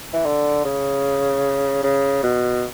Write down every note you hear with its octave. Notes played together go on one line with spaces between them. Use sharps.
E3
D3
C#3
C#3
B2